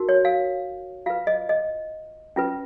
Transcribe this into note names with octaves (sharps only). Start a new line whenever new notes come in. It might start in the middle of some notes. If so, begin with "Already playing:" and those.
Already playing: D#4 F#4 A#4
C#5
F5
F4 B4 F5
D#5
D#5
C#4 F4 B4